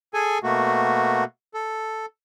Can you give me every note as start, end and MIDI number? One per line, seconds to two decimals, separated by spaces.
0.14 0.38 68
0.14 0.38 69
0.14 0.38 80
0.43 1.24 47
0.43 1.24 57
0.43 1.24 58
0.43 1.24 66
1.54 2.06 69